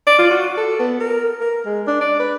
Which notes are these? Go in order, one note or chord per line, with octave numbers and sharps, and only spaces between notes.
D5
F4
F#4
A4
B3
A#4
A#4
G#3
D4
D5
B4